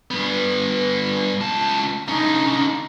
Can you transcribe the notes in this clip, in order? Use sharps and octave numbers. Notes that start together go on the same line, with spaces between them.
G2 B3
C#2 A5
D3 C#4 D#4